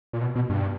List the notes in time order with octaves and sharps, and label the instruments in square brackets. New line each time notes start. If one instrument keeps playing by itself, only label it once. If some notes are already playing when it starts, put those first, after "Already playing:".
[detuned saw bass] A#2
B2
B2
G2